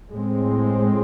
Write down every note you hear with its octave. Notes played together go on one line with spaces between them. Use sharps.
A2 G#3 C4